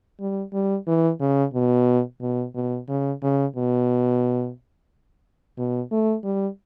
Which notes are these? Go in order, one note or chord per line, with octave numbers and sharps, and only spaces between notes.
G3
G3
E3
C#3
B2
B2
B2
C#3
C#3
B2
B2
A3
G3